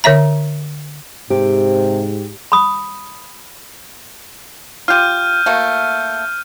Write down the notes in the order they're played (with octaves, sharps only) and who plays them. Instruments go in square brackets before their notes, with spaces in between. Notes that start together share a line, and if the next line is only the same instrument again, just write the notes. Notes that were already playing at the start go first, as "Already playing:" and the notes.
[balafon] D3 C#5 E5 A#5
[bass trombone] G#2 [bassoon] C3 [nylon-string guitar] G4
[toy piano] B5 D#6
[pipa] F4 G4 [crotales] F6 G6 D#7
[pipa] A3 A#3 F#4